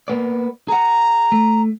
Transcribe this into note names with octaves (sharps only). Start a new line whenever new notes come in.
A#3 B3 D5
G#4 F#5 A#5
A3